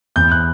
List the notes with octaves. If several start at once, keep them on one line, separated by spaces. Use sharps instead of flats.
E2 G6
F#6